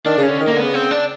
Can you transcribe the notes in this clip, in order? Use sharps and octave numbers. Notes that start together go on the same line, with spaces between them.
D#3 D4
C#3
C#4
D3
D#3
D3 A#3
B3
C#3
C4
D4